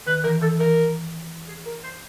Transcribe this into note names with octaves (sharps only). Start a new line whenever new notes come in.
D#3 B4
E3 A#4
E3 A4
E3 A#4
G#4
A#4
C5